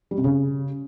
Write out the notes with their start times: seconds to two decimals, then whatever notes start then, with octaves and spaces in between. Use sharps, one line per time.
0.11 G3
0.18 C3
0.24 C#3